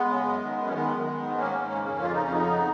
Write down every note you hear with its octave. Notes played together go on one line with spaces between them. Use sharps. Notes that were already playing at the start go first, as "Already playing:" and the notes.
Already playing: G#3 B3
C#3
F#2
D#3
F#2
C#4
D#3 G#3 B3
F#2
D#3
G#2
D#3 A#3 C#4
G#2
C#3
F2
C#3 F4
D#4
F2 C#4
C#3 B3 D#4